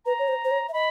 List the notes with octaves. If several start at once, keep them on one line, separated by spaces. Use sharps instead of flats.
B4 A#5
C#5
C5
C5
C#5
E5
D#5 B5